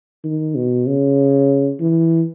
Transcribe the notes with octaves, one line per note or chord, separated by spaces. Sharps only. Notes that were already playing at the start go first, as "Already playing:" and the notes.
D#3
B2
C#3
E3